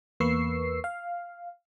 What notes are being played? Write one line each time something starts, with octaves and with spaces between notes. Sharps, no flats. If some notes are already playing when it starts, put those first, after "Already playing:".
E2 A#3 B4 C#6 E6 C7
F5